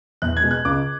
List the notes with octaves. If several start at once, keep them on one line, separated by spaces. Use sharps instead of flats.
E2 F#6
G#6
B2 G#3
F#6
C#2 D6